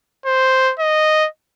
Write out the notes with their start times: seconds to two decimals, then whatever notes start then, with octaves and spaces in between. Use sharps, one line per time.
0.26 C5
0.80 D#5